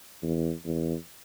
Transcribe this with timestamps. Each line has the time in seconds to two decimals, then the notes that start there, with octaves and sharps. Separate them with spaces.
0.23 E2
0.65 E2